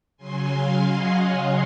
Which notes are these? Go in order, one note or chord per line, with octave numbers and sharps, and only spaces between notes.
C#3 F#3 G#5 C6
F5 G#5
D#5 F#5
C#5 F5